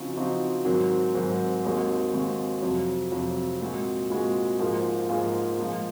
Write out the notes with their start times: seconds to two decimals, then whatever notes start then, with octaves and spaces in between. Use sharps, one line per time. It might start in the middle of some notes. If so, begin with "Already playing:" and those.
Already playing: C#3 F3 C4 D#4 F#4
0.16 C#3 F3 C4 D#4 F#4
0.65 G#2 D#3 F#3 C4
1.14 G#2 D#3 F#3 C4
1.64 D#2 D#3 G#3 C4 F#4
2.13 D#2 D#3 G#3 C4 F#4
2.62 F2 C3 F#3
3.12 F2 C3 F#3
3.61 A#2 G#3 C4 F#4
4.10 A#2 G#3 C4 F#4
4.59 G#2 F3 A#3 F4 G#4
5.09 G#2 F3 A#3 F4 G#4
5.58 A#2 F3 G#3